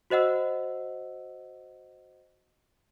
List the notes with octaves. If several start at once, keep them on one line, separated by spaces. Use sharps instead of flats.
F#4 C5 D#5 F#5 E6